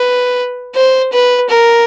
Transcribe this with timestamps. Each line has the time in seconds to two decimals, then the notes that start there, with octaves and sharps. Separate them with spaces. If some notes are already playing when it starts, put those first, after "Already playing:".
Already playing: B4
0.76 C5
1.13 B4
1.50 A#4